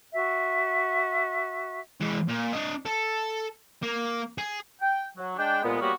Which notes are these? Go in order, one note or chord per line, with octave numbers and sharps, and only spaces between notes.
F#4 E5
E3 G#3
A#2
D4 D#5
A4
A#3
G#4
G5
F#3
G#3 D4 G5
C2 A#2 G#3 B3
F#3 G3 A#3 B3 F#4